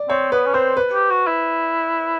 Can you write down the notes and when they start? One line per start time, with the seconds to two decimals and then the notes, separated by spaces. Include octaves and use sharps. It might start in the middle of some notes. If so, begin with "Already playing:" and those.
Already playing: D5
0.09 C4 C#5
0.32 B3 B4
0.46 C#4
0.54 C4 C5
0.77 B4
0.93 G4
1.10 F#4
1.27 E4